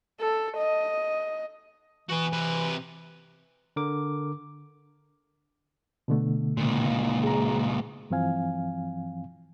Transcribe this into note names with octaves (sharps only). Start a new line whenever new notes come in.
A4
D#5
E3 F#4 B4
C3 B4
D3 A#4 D6
B2 D3 A3
C#2 A#2
G#4 A#5
G2 E3 F3 C4 F5 G#5